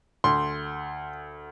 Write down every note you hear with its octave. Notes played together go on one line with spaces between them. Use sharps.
D2 C6